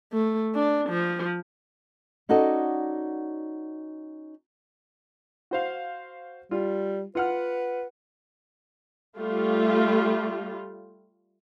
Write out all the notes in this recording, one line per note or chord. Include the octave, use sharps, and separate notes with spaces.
A3
D4
F3
C#4 D#4 F#4 A4 D5 D#5
F#4 C5 F5
G3 F4
F4 B4 F#5 F6
G3 A3 F4